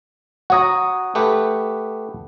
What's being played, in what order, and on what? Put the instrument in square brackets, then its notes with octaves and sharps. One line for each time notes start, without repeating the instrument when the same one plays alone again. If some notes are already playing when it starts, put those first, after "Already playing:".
[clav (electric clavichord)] F#4 C#5 A#5 [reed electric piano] F#5 D#6
[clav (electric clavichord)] A3 G4 B4